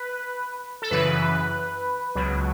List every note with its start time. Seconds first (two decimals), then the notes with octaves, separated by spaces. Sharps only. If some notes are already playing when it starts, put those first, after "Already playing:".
Already playing: B4
0.82 A4
0.91 F#2 C#3 E3 B4
2.15 C#2 B2 F#3